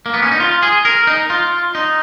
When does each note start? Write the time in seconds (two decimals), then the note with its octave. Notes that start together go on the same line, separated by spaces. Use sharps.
0.06 A#3
0.14 B3
0.22 C#4
0.31 D#4
0.40 F4
0.63 G#4
0.85 A#4
1.07 D#4
1.30 F4
1.75 D#4